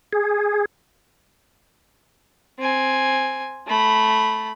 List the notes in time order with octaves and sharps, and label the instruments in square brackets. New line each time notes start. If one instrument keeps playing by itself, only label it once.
[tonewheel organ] G#4
[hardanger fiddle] C4 G#5
A3 B5